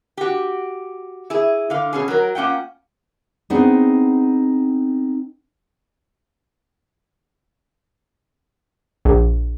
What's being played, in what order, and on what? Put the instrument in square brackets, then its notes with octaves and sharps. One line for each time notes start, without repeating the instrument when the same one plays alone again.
[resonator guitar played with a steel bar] F#4 G4
E4 G#4
D3 F5
B2 C#4 G#4
F#3 A#4
A#3 C#4 F4 F#5 G5
[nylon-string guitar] B3 C4 D4 D#4 G#4
[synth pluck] A#1